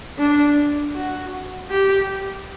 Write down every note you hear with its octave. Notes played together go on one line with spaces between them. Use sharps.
D4
F#4
G4